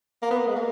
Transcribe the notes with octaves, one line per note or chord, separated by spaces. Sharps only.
A#3
B3
A#3
G#3
A#3